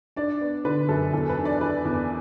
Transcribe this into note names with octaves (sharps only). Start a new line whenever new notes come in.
D4 D5
B3
D3 B4
F#2 A4
E2 A4
B4
D4
D5
E3 B4
E2